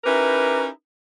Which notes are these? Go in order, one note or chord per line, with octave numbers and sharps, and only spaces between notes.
C#4 D#4 E4 G4 A#4 B4